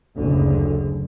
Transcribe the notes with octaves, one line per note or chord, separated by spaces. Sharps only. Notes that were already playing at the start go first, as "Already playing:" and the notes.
F#1 D2 D3